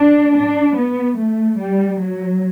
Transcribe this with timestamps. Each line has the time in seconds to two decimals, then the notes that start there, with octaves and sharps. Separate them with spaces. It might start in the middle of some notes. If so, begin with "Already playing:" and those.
Already playing: D4
0.35 D4
0.77 B3
1.18 A3
1.59 G3
2.00 F#3